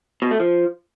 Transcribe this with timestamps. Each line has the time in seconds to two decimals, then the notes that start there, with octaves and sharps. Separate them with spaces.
0.22 B2
0.31 A3
0.40 F3